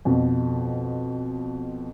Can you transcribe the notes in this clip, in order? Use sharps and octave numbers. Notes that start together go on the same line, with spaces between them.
F2 B2